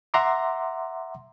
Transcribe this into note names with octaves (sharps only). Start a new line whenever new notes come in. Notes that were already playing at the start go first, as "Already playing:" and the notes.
E5 F#5 A#5 C6 D6